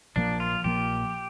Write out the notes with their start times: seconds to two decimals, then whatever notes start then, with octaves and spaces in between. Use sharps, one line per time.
0.16 A#1 A#2 F3 A#3 D4
0.40 F4
0.64 A#1 A#2 F3 A#3 G4